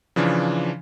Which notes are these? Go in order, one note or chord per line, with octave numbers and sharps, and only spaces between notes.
C#3 E3 F3 D4